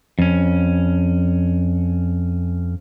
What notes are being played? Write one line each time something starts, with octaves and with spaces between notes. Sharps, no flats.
F2 C#4